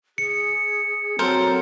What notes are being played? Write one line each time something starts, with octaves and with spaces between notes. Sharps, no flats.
G#4 C#7
F#3 C4 A4 A#4 C5